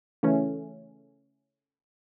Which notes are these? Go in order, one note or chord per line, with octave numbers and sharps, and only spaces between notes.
C#3 E3 A3 C#4